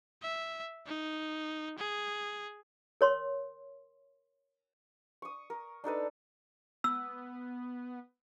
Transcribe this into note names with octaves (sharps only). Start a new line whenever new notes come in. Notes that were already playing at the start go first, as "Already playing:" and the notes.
E5
D#4
G#4
A#4 C#5 C6
C#6 D#6
A#4
D4 D#4 A4 B4
B3 E6